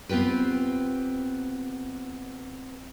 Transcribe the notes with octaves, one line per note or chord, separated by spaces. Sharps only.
B3 C4 F4 G4 B4